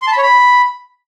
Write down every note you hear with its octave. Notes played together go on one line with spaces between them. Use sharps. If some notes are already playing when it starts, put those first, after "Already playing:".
C6
A5
B5
C#5
B5